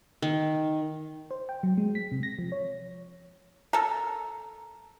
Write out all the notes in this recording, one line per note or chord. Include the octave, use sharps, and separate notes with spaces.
D#3
C5
G5
F#3
G#3
B6
C3
A#6
F3
C#5
A4 A#4